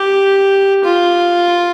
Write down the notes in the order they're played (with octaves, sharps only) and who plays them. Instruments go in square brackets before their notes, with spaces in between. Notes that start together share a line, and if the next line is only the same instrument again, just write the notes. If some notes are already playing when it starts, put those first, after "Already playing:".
Already playing: [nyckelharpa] G4
F4